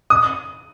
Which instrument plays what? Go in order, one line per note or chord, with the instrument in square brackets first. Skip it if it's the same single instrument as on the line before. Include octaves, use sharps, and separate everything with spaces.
[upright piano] D#6